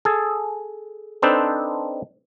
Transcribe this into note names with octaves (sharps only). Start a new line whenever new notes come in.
G#4 A4
C4 D4 D#4 A4 B4 C5